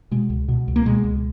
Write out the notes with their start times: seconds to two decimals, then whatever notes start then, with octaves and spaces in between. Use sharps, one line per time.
0.11 B2 G#3
0.30 C#2
0.48 B2
0.68 C#2
0.76 A#3
0.85 B2 G#3
1.04 C#2